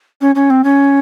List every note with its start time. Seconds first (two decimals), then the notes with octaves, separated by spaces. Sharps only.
0.21 C#4
0.35 C#4
0.50 C4
0.64 C#4